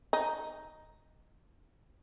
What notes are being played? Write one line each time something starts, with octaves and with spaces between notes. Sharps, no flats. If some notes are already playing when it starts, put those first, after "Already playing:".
D#4